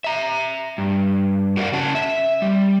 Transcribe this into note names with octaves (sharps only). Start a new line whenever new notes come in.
E5 A#5
G2
F#4 A#4 D5 D#5 F5 F#5
C#3 C#4 A5
E5
G3